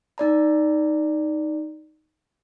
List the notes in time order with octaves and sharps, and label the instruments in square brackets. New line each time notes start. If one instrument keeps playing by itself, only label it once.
[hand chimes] D#4 D5 A#5